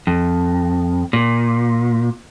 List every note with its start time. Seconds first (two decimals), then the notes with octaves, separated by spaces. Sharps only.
0.07 F2
1.13 A#2